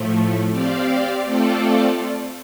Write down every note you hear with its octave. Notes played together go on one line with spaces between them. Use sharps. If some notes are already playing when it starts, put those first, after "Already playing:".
Already playing: A2 F3 A3
C4 G4 D5 F5
A3 C4 F4 A4 D5